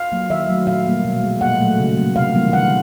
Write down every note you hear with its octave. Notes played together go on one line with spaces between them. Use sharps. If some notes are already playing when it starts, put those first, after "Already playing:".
Already playing: F5
F#3 A#3
D#3 E5
F#3 A3
A#2 F5
G3 A#3
B2
G#3
A#2 F#5
F#3 A3
C#3
F#3 A#3
C3 F5
E3 G3 A#3
D3 F#5